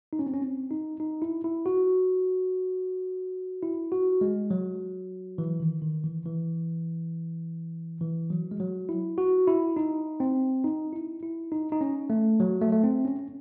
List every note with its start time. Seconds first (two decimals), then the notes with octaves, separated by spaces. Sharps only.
0.13 D#4
0.19 C#4
0.27 C4
0.34 C#4
0.42 C4
0.71 D#4
1.00 D#4
1.22 E4
1.44 E4
1.66 F#4
3.62 E4
3.92 F#4
4.21 G#3
4.51 F#3
5.38 E3
5.60 D#3
5.82 D#3
6.04 E3
6.26 E3
8.01 E3
8.30 F#3
8.51 G#3
8.60 F#3
8.89 E4
9.18 F#4
9.47 E4
9.77 D#4
10.20 C4
10.64 D#4
10.93 E4
11.23 E4
11.52 D#4
11.72 D#4
11.81 C#4
12.10 A3
12.40 F#3
12.62 A3
12.72 A3
12.83 C4
13.05 C#4
13.19 C#4